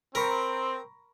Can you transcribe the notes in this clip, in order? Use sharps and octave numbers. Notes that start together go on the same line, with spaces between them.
C4 A#4 A#5 B5 C#6